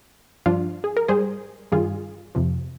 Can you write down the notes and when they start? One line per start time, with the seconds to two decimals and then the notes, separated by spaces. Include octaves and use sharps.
0.46 G2 F3 D4 F4
0.84 G#4
0.97 A#4
1.08 G#2 G3 G#4 C5
1.72 G2 D#3 G3 F4 G#4
2.35 F2 C3 F3